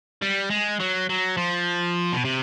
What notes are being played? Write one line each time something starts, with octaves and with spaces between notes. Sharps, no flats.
G3
G#3
F#3
F#3
F3
B2
C3